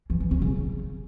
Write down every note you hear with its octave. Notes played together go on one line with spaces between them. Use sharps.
E3
E3
C#4
C#3